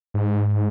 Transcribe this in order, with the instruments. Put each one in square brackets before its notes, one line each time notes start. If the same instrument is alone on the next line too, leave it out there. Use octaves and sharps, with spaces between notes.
[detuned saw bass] G#2